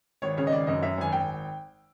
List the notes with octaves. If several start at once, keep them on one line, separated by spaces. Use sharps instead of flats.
G#1 C#5
C#3 C#5
D#5
G#1 D5
F#2 D#5
F#2 E5
G#1 G#5
G#1 G5